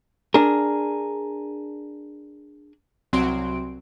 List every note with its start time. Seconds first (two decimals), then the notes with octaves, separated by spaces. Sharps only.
0.34 D4 G#4 A#4
3.13 C2 F#3 C4 F#4 C6 D7